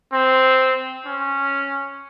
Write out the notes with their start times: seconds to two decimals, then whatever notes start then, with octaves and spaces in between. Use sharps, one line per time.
0.13 C4
1.06 C#4